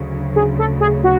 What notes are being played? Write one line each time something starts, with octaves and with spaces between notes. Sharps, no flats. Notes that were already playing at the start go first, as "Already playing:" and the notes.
Already playing: D2 C#3 F#3
G#4
A4
G#4
F#4